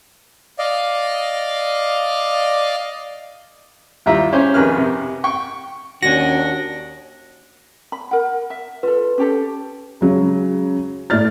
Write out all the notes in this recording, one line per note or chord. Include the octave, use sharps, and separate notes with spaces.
D5 D#5 F5
D#2 G3 E4 F4 E5 A#5
C#4 G4 G#4 C5
F2 D#3 G#4 B4 F6
C3
G5 C#6
D#2 C#4 D4 F#4 A#6
B5
A#4 F#5
E5
F4 A4 B4
C#4 G4 A4
C#3 F#3 G#3
A2 E4 D5 F6 A6